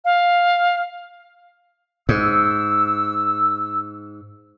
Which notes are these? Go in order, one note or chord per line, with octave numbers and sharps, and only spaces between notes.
F5
G#2 E6